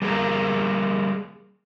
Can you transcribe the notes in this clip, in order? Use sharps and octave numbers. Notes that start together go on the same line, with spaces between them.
G3 A#3 G#4 A#4